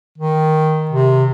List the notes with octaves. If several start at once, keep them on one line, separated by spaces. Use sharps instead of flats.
D#3
C3